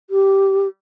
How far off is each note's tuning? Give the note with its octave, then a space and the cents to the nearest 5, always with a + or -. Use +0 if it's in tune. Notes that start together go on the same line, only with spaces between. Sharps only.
G4 -10